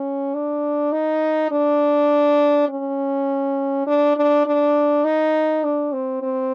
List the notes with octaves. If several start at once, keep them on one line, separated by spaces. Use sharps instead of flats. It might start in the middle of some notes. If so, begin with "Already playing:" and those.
Already playing: C#4
D4
D#4
D4
C#4
D4
D4
D4
D#4
D4
C4
C4